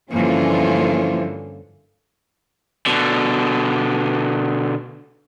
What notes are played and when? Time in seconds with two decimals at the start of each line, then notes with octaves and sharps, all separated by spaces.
0.11 G2 D3 E3 F3 A#3 C#4 F4
2.86 B2 D3